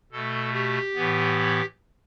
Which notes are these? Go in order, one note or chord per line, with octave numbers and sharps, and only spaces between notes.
B2 A3 A4
G4
A2 E3 B3